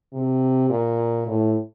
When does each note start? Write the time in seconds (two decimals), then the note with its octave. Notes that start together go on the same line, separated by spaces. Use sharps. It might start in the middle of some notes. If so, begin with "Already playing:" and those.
0.13 C3
0.70 A#2
1.27 A2